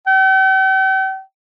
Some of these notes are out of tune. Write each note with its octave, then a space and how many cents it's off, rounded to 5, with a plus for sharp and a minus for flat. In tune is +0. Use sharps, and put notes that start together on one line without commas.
G5 -45